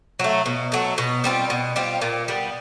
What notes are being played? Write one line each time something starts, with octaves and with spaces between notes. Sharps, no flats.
F#3 A3
B2
F#3 A3
B2
G3 C4 F4
B2
G3 C4 F4
A#2
G3 B3